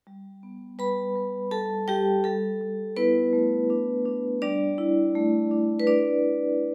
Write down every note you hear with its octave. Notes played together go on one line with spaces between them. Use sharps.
G3
B3
G3 B4 B5
G3
G3 A4 A5
G3 G4 G5
G3 A4
G3
B3 E4 B4
A3
D4
D4
G3 D4 D5
E4
A3
D4
B4
D4 E4 D5